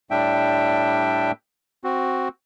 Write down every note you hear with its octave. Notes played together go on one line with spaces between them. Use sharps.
A2 G3 D4 E5 G5
C4 F#4